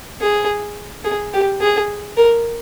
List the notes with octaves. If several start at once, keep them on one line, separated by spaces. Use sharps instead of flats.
G#4
G#4
G4
G#4
A#4